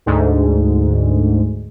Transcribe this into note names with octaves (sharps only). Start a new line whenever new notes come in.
D2 G#2